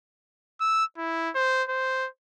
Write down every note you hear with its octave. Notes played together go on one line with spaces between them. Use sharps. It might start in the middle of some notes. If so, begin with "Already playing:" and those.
E6
E4
C5
C5